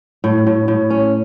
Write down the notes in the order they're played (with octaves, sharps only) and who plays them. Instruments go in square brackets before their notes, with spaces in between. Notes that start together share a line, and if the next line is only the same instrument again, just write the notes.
[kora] A2
A2
A2
C#4